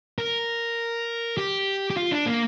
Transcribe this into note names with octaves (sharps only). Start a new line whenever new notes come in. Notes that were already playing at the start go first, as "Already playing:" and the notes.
A#4
G4
G4
F4
D4
A#3